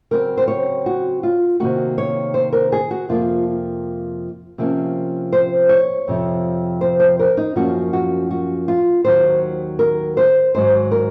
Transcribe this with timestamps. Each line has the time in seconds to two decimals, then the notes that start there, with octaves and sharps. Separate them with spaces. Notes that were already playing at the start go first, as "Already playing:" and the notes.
0.11 C#3 F#3 C4 A#4
0.37 C5
0.48 C#5
0.86 F#4
1.23 F4
1.60 C3 D#3 A#3 F#4
1.98 C#5
2.34 C5
2.53 A#4
2.72 G#4
2.91 F#4
3.09 F2 C3 F3 A#3 F4
4.58 C3 F3 A#3 C#4
5.33 C5
5.69 C#5
6.08 F2 C3 F3
6.81 C5
7.00 C5
7.19 A#4
7.37 D#4
7.56 F#2 F3 A#3 C#4 F#4
7.93 F#4
8.31 F#4
8.68 F4
9.04 D#2 D#3 F#3 C5
9.79 A#4
10.17 C5
10.55 G#2 D#3 F#3 C5
10.91 A#4